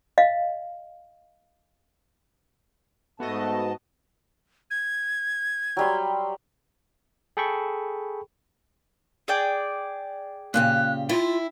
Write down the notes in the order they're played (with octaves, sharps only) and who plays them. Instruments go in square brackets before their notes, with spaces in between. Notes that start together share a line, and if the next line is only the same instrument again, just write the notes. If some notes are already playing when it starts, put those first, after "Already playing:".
[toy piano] D#5 F5
[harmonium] G#2 A5 [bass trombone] A3 [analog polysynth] B3 F#4 D#5
[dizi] G#6
[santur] F#3 G3 C6
[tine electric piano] G#4 A4 G5 B5 C#6
[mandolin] G#4 D5 G5
[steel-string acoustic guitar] A#2 C#3 G4 [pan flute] F#6
[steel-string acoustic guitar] E4 [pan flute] F4